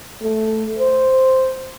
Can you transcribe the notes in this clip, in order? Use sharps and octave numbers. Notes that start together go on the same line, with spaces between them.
A3
C5